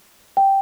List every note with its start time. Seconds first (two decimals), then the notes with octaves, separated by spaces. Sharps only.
0.37 G5